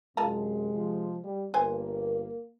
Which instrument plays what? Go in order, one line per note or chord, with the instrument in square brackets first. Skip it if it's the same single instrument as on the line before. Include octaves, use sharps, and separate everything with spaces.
[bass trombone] F#2 [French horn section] C3 G#3 [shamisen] F4 A5 A#5
[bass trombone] F3
G3
[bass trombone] G1 [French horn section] A#3 [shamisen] B4 C5 G#5